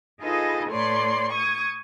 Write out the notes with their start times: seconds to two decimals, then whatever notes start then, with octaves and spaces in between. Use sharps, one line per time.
0.21 D#4 F4 G#4 A4 B4 D#5
0.70 A2 A3 B4 C#5 D5 C6
1.31 C#6 D#6 G#6